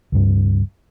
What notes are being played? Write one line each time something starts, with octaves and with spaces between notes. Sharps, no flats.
C#2 G2